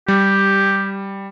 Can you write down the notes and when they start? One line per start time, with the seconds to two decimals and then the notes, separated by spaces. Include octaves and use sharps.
0.08 G3 G4